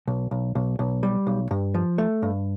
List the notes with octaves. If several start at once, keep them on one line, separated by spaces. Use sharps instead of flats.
B1
B1
B1
B1
G3
B1
G2
F3
A3
G2